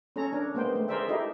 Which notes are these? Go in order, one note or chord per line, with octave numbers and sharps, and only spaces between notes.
C#4 A4 C#5 A#5
D4 A#4
G#3 A#3 B3 C5 G5
A3
G#4 A#4 C5 D5 E5 G5
D#4 E4 G4 A4 A#4 D#5